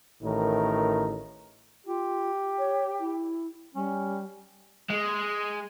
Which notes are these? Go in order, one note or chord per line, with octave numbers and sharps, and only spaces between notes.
A1 A2 D#3 E3 A#4
F4 G4
C#5
E4
G3 C#4
G#3